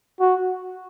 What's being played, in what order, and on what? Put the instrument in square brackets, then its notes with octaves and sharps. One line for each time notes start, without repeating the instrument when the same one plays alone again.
[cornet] F#4